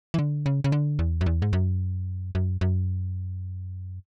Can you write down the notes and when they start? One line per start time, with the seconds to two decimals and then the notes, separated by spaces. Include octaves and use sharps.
0.14 E3
0.19 D3
0.46 C#3
0.64 C#3
0.72 D3
0.99 E2
1.21 F#2
1.26 E2
1.42 G#2
1.53 F#2
2.35 F#2
2.61 F#2